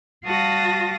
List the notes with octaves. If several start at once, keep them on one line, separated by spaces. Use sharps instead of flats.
G3 F#4 F5 A5 D#6 A#6